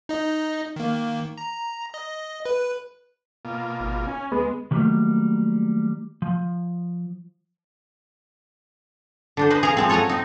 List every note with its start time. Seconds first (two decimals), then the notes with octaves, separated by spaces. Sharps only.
0.09 D#4 D#5
0.76 D#3 A#3
1.38 A#5
1.94 D#5
2.45 B4
3.45 B2 A#3 F4
3.80 G#1
4.07 C#4 G#5
4.32 D2 G#3 B3
4.71 D#3 E3 F#3 G3 A3 A#3
6.22 F3
9.37 D3 D4 C5
9.50 B4 C5 D#5
9.63 G#4 A#4 F5 A#5
9.77 F3 G#3 C4
9.89 A4 C#5 F#5 G#5 A#5
10.09 C4 D#4